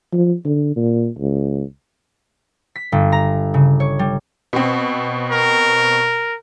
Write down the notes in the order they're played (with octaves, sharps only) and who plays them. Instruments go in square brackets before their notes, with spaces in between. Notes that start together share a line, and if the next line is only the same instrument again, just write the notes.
[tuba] F3
D3
A#2
C#2
[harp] B6
G1
A#5
C#3
C#5
G3
[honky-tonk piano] B2 C4
[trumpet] A#4